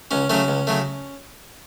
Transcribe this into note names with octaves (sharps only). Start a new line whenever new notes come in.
C#2 C#4
C#3 F#3 A3 C#4
C#2
C#3 F#3 A3